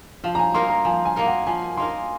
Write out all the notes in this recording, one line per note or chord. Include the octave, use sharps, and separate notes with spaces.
F3 F5
A#5
G#5
A#3 D#4 A#4 C6
A#5
F3 G#5
G#5
A#3 D#4 A#4
F#5
F3 G#5
A#3 D#4 A#4 C6